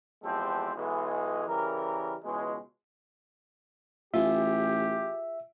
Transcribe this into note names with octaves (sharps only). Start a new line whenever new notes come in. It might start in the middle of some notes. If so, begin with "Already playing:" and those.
E2 F3 G#3 C4 G4 A4
B1 E3 G#3
C#3 E3 G3 A#4
C#2 B2 E3 G#3
A1 F4 G4 G#4 E5